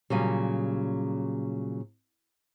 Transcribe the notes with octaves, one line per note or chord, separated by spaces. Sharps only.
A#2 C#3 F#3 G3